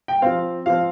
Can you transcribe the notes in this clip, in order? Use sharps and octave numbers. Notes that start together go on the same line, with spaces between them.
G5
F3 C4 F5
F3 C4 F5